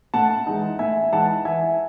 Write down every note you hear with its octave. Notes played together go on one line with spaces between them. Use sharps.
A2 F#5 A5
E3 G#3 D#4
A2 E5 G#5
E3 G#3 D#4 F#5 A5
E3 E5 G#5